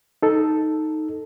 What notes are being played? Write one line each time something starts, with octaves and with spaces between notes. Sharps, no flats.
D#4 A4